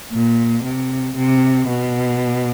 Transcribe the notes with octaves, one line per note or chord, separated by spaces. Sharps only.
A#2
C3
C3
B2